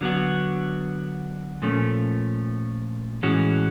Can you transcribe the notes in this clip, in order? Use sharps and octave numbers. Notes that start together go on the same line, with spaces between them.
D3 F#3 B3 D4 F#4
A#2 F3 A3 C#4
A2 E3 G#3 C#4 F#4